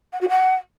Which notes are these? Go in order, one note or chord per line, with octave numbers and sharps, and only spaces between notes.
F#5
F#4
F#5